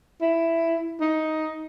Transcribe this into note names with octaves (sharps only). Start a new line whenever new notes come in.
E4
D#4